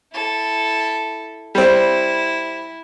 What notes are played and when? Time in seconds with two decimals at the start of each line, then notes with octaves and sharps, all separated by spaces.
0.12 E4 A4
1.55 G3 C4 E4